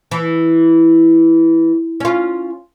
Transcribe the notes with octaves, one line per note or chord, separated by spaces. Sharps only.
E3
C#4 F4